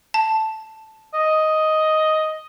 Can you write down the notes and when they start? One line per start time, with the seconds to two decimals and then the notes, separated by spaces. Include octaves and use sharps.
0.14 A5
1.14 D#5